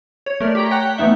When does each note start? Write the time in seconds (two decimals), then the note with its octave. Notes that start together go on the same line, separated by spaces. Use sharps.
0.26 C#5
0.40 A3 A#4 D5
0.55 G4 G5 A#5
0.71 C#5 F#5 G5 F#6
0.98 E3 A3 B3 D#4 E5